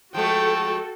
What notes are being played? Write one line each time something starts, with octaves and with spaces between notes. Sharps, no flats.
F3 G#3 A3 F#4 A4 G5 A5